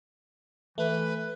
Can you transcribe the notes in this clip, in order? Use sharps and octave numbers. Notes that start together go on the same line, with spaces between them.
E3 A3 B4